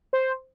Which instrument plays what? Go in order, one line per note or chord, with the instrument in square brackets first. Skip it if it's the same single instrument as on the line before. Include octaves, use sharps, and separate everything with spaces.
[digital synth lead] C5